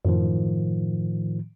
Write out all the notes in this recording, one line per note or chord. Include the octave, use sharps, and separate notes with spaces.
F#2 A2 D#3 F3